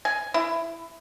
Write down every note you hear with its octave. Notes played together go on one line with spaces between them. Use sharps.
G#5
E4